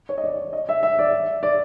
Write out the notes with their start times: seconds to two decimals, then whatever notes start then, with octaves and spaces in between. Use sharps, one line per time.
0.09 C#5
0.18 D#5
0.24 D5
0.53 D#5
0.69 E5
0.83 E5
0.99 D5
1.43 D5